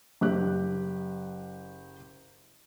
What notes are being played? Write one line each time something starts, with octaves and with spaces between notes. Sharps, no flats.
F#1 G4 F#6